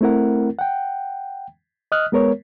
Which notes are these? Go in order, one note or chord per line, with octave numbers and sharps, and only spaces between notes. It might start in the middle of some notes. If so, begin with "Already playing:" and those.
A3 C4 E4 A#4 F#5
F#5 G5
D#5 D#6 F6 F#6
G#3 B3 A#4 C#5